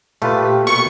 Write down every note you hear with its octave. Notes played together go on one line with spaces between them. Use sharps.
A#2 A3 F4 G4 B4
B2 B3 C#6